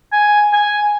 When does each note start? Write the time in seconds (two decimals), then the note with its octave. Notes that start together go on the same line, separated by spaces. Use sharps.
0.13 G#5
0.53 G#5